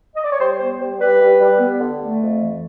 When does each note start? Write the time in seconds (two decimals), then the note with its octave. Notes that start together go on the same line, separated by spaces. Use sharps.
0.16 D#5
0.24 D5
0.32 C#5
0.40 G3 C5
0.60 B3 C5
0.80 G3 C5
1.00 G3 B4
1.21 G3
1.40 G3
1.60 B3
1.80 D3
2.01 A3
2.21 F2
2.41 E3